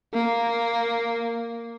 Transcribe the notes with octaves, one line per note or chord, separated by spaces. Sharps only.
A#3